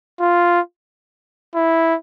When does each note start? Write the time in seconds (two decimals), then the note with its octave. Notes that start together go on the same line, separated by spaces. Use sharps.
0.20 F4
1.55 E4